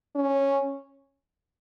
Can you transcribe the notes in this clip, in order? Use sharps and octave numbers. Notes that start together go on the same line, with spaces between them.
C#4